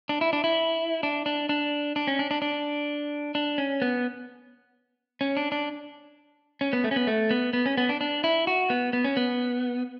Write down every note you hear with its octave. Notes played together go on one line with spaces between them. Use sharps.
D4
E4
D4
E4
D4
D4
D4
D4
C#4
D4
D4
D4
D4
C#4
B3
C#4
D4
D4
C#4
B3
A3
C#4
B3
A3
B3
B3
C#4
B3
D4
D4
E4
F#4
B3
B3
C#4
B3